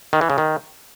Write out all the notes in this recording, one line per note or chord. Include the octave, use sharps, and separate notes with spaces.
D#3
E3
C#3
D#3